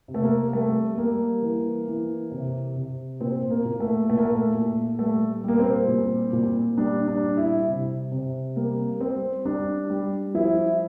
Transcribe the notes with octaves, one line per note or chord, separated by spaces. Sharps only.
C3
A3
A#3
G3 A3
G3 A#3
E3
E3
C3
C3
A#2 C4
A#3
A#2
A3
A#2 A3
A#3
A3
A#2
G3 A3
G3 A#3
C4
A#2
A#2
G3 D4
D4
G3
E4
C3
C3
G3 A#3
G3 C4
G3 D4
G3
F3 E4